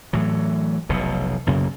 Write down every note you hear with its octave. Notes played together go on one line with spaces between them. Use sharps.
A2 E3 F#3
F1 B1 B2
B1 F#2 C#3 A#3